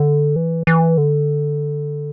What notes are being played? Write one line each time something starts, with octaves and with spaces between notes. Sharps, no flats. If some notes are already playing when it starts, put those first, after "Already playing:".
Already playing: D3
E3
E3
D3